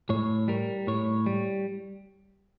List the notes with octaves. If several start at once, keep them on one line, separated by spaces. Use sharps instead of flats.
A2 C#5
G3 A#4
A2 C#5
G3